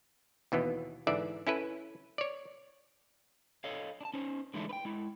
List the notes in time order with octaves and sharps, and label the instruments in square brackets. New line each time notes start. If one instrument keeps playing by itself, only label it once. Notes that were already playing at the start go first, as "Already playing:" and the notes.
[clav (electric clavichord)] D#2 B2 E3 B3
G#2 D3 E3 D5 E5
C#4 E4 A4 B4
C#5 D5
[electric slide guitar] A4 C#5 D#5 F5
D4 A5
C#4 D#4 C5
D3 E3 G#3 A3 D4 D#4
B4 G5
G#3 E4